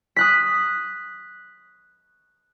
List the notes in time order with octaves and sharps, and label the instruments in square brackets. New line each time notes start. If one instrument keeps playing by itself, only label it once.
[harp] D#6 F#6 B6